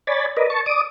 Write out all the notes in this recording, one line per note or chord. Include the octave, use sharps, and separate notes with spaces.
C#5 D5 G#5 B5 A6
A#4 B4 D5 D#5
A5 C#6
D5 D6 D#6